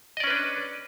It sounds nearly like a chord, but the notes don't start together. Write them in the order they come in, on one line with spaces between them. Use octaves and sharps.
D#5 D5 C#4 B4 D4